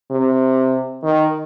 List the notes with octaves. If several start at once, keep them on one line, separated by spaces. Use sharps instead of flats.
C3
D#3